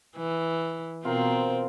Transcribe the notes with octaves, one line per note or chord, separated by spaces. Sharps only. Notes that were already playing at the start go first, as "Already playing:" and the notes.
E3
B2 C4 F4 A#4 C5